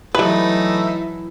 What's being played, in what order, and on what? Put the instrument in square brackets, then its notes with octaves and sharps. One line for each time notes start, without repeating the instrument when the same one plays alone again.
[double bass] E3 F#3 [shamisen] G3 B4 [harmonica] A3 D#4 E5 [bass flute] E4